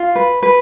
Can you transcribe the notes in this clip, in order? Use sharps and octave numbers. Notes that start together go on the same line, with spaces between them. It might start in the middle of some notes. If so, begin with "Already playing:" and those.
Already playing: F4
B4
B4